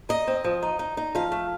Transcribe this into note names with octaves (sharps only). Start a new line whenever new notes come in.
D#4 D#5
C4
F3
D#4
D#4
D#4
F3 F5
A3